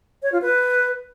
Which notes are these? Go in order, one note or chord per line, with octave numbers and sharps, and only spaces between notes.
C#5
F4
B4